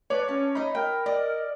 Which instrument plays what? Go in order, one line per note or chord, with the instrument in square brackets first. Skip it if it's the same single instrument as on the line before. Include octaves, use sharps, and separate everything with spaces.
[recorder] B4 [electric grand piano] C#5 [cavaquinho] D5 A5
[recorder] C#4 [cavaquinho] A5
[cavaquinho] D#4 D#5 [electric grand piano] B5
[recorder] A#4 [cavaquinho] G5
[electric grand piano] D5 [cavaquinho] D#5